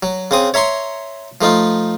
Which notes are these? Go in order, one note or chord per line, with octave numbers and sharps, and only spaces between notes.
F#3
C#3 C4 D#6
C#5 E5 A#5 C6 C#6
F3 A3 D#4 F4